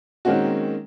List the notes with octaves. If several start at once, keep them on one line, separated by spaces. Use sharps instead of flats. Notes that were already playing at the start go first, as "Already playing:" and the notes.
D#3 G#3 A#3 C4 C#4 F#4